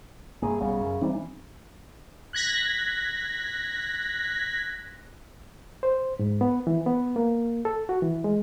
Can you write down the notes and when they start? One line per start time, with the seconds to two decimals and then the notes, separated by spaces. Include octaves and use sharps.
0.42 G2 C3 A#3 G#4
0.60 B1 C#3 G3 B3
0.81 F#2
1.01 E3 G3 C4 D#4
2.33 F#6 G#6 A#6 B6
5.83 C5
6.19 G#2
6.41 B3
6.67 E3
6.86 B3
7.16 A#3
7.65 A4
7.89 F#4
8.02 E3
8.24 G#3